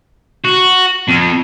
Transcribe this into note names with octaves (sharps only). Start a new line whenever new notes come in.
F#4
F2